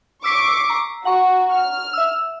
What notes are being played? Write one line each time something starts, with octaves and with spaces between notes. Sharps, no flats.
C#6 D6 E6 B6 C7
A#5
F#4 F#5 A#5 C#6
F6
E5 E6